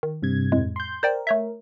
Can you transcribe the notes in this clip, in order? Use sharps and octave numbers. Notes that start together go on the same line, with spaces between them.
D#3
G2 C3 G#6
F2 A2 G#3
C6 G6
A#4 C5 D5 G5
A3 C#5 E5